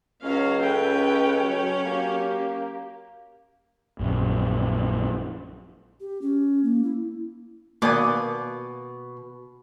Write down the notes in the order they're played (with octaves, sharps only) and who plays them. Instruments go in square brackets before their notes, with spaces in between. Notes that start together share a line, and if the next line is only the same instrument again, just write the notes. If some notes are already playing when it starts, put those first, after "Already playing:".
[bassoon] C#2 [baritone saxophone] F#3 [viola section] C#4 F5
[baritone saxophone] C#4 [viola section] A4 B4 G5
[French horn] F#3
[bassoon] A#3 [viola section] G4
[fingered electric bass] A#1 F#2
[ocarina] G4
C#4
A#3
E4
[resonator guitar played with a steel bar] B2 [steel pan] A#3 D5 G#5 [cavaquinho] D6 D#6